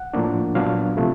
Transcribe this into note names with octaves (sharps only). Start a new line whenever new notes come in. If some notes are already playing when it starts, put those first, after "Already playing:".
Already playing: F#5
A2 F3 A#3 D4
A#2 F#3 B3 D4 F5
C3 F3 A3